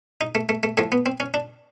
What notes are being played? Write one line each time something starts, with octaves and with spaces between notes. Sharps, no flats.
D#4
A3
A3
A3
A2 F3 A3
B3
C4
C#4
D4